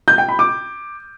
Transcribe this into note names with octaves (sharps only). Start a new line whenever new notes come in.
G6
G5
B5
D6